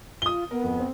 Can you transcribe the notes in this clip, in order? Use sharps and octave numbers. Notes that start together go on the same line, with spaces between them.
F4 D#6 G7
B3 A#4
F2
C4